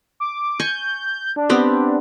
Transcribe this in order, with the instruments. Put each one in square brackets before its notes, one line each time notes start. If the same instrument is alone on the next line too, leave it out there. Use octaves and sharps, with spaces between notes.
[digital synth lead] D6
[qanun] G#5 C#6 [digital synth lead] G6
[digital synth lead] D4
[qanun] B3 C4 G4